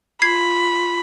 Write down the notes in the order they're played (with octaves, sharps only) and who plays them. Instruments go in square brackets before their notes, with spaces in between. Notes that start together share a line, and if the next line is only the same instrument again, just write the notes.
[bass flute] F4 [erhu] B5 [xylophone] G#6 C7